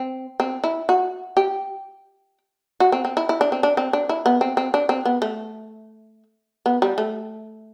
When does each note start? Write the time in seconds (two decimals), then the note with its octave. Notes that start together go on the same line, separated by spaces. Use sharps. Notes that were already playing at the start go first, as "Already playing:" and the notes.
Already playing: C4
0.40 C4
0.64 E4
0.89 F#4
1.37 G4
2.80 F#4
2.92 C4
3.05 C4
3.17 E4
3.29 E4
3.41 D4
3.52 C4
3.63 D4
3.77 C4
3.93 D4
4.09 E4
4.26 B3
4.41 C4
4.57 C4
4.74 D4
4.89 C4
5.05 B3
5.22 A3
6.66 B3
6.82 G3
6.98 A3